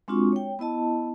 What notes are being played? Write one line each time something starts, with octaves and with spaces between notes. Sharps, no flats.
G#3 C4 D4 F4 F#4 C#6
C#5 G5
B3 E4 D#5 A5